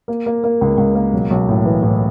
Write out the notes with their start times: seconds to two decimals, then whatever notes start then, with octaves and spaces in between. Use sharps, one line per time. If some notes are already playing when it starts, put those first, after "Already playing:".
0.08 A#3
0.26 A#3
0.44 A#3
0.61 C#2
0.78 C#2
0.95 A#3
1.13 B1
1.31 B1
1.49 A2
1.65 E3
1.82 A2